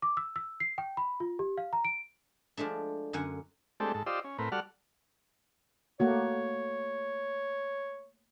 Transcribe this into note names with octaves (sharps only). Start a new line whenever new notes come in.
D6
E6
E6
C7
G5
B5
F4
G4
F5
A#5
D7
F3 G#3 A3 D4
F#2 D3 F#5 G#5
G#3 A3 C4 D4 G4 A4
G#2 A4
F4 G4 C5 D5 D#5 E6
C#4
A2 C4 A#4 B4
G3 F#4 A4 D5 F#5 F6
A3 A#3 F#4 C#5